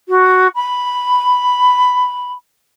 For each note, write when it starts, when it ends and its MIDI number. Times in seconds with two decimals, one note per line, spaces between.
0.09 0.48 66
0.55 2.33 83